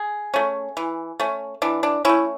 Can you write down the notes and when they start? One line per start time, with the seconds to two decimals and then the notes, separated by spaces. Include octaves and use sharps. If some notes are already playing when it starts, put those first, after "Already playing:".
Already playing: G#4
0.34 A3 C#4
0.77 E3
1.20 A3 C#4
1.62 E3 D4
1.83 D4
2.05 A3 C#4 E4